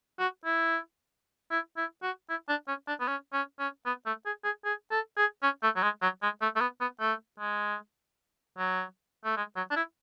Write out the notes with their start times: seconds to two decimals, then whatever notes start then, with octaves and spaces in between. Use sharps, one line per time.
0.19 F#4
0.45 E4
1.51 E4
1.77 E4
2.03 F#4
2.30 E4
2.49 D4
2.68 C#4
2.88 D4
3.01 B3
3.08 C#4
3.33 C#4
3.59 C#4
3.86 B3
4.06 A3
4.26 G#4
4.45 G#4
4.65 G#4
4.91 A4
5.17 G#4
5.43 C#4
5.63 A3
5.76 F#3
5.83 G#3
6.02 F#3
6.22 G#3
6.42 A3
6.56 A3
6.61 B3
6.81 B3
7.01 A3
7.40 G#3
8.59 F#3
9.25 A3
9.37 G#3
9.56 F#3
9.71 D4
9.76 E4